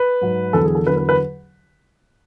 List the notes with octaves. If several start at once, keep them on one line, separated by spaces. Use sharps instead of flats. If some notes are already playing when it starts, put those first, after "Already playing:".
Already playing: B4
G#2 F#3
E2 D3 F#3 A4
G#4
A4
E2 D3 F#3 B4
B4
B4